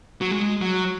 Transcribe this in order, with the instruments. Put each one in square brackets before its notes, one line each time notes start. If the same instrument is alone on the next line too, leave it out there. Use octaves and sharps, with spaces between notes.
[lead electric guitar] F#3
G#3
F#3